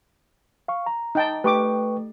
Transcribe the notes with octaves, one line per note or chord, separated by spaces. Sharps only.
F5 C#6
A#5
D#4 G5 A5
A3 G4 B4 G5 C#6 D6